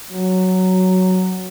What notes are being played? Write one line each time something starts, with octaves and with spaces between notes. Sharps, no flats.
F#3